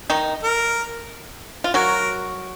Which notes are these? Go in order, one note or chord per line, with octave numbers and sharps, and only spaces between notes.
D#3 D#4
A#4
F4
F#3 F#4 A#4